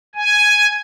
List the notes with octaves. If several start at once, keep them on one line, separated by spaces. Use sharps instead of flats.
G#5